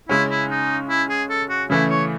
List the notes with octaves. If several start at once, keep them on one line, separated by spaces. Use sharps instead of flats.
C#3 G#3 C#4 E4
E4
D#4
E4
G#4
A4
F#4
C#3 E3 A3 E4
C#5